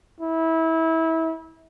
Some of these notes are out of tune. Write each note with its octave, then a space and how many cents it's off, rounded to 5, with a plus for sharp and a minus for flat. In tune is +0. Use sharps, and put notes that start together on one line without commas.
E4 -25